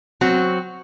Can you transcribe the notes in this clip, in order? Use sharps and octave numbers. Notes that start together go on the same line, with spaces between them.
F#3 C4 F#4